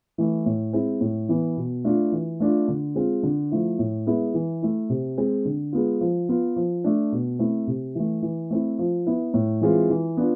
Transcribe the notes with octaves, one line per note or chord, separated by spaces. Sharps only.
E3 A3 E4
A2
G#3 C4 E4
A2
E3 B3
B2
A3 D4 F4
E3
A3 D4 F4
D3
G#3 C4 F4
D3
F3 A3 E4
A2
G#3 B3 E4
E3
A3 E4
C3
G#3 C4
D3
G#3 B3 F4
F3
B3 F4
F3
A3 D4
B2
A3 C4 E4
C3
E3 A3
E3
A3 C4 E4
F3
B3 E4
A2
E3 G#3 C4 F4
E3
B3 D4 F4